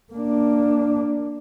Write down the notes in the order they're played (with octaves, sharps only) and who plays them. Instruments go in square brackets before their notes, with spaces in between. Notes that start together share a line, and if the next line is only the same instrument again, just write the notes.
[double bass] A#3 D4